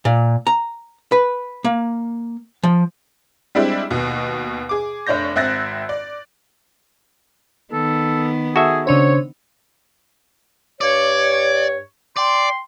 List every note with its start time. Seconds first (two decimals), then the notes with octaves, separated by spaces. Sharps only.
0.05 A#2
0.47 A#5
1.12 B4
1.64 A#3
2.63 F3
3.55 G3 G#3 C4 D4 E4 G4
3.91 D#2 B2
4.69 G#4 D6
5.07 F1 D4 C#5 G6 A#6
5.36 G#1 C4 E5 F#6 A6 A#6
5.89 D5
7.73 D#3 B3 A4
8.56 F#4 G#4 A4 E5
8.87 C#3 D4 C5 C#5
10.81 G2 C#5 D5
12.17 D5 G5 C6